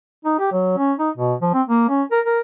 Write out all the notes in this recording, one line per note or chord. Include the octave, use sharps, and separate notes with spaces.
D#4
G4
F#3
C#4
D#4
B2
F3
C4
A#3
C#4
A#4
A#4